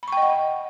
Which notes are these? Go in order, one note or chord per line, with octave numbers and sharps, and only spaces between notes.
D#5 F#5 G5 B5 C#6